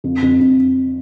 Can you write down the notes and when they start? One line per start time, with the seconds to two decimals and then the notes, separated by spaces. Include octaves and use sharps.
0.04 F2
0.22 F2
0.40 F2